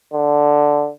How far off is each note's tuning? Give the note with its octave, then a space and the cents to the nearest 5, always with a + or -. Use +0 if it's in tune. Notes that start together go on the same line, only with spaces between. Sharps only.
D3 +0